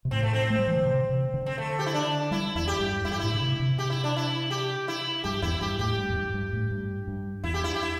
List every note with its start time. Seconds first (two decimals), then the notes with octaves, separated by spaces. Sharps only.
0.05 C3
0.11 A2 C4
0.23 A3
0.33 C4
0.50 A3
0.59 G3
0.68 E3
0.76 D3
0.85 C3
1.09 C3
1.34 D3
1.46 C4
1.58 A3
1.79 G4
1.86 E4
1.94 D4
2.31 G3 E4
2.55 E2 E4
2.68 G4
2.80 G2
3.05 G2 E4
3.12 G4
3.20 A2 E4
3.33 D3
3.41 C3
3.60 C3
3.78 G4
3.90 E4
4.04 D4
4.16 E4
4.51 G4
4.88 E4
5.24 G2 G4
5.42 E2 E4
5.61 G2 G4
5.79 A2 G4
5.98 G2
6.10 E2
6.16 G2
6.34 G2
6.53 A2
6.71 G2
7.08 G2
7.44 E2 E4
7.54 G4
7.64 E4
7.74 G4
7.83 E4